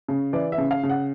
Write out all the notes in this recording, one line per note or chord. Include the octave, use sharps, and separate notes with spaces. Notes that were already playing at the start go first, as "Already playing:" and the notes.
C#3
E3 D5
E5
C#3
F5
C#3
F#5